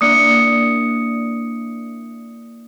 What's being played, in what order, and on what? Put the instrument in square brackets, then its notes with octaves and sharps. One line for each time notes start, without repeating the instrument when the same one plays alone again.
[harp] A#3 D4 E4 [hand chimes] D#6 C#7